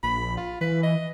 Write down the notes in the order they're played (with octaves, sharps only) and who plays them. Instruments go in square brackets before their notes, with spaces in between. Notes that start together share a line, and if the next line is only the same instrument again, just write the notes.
[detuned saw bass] A#1 [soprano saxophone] B5
[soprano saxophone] F4
[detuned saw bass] E3 [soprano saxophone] B4
[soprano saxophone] D#5